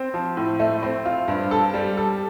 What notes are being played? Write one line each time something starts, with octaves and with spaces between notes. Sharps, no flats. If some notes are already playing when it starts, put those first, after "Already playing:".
Already playing: C4
F3
A2
A3
C4
F4
G2
A4
G3
A4